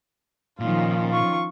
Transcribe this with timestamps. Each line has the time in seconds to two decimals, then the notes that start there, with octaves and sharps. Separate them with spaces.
0.60 A#2 D#3 F3 C#4 F4
1.10 F4 C#6